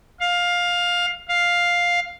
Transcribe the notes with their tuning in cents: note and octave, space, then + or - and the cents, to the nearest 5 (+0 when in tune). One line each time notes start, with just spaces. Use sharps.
F5 +15
F5 +5